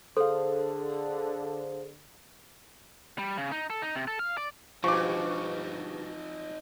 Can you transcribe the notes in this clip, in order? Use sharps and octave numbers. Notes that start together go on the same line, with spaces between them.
D3 G#4 A4 C5 F5
G3
C#3
D#4
A4
D#4
C3
A4
F5
D5
G2 B2 F3 C4 D#4 C#6 D6